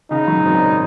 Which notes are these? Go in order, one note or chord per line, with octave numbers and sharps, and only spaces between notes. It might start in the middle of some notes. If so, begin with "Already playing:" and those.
C#3 D#4
F#3
G#1